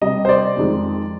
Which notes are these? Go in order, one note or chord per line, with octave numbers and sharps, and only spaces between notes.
C3 G3 D#5
C5
D5
F2 D#3 G#3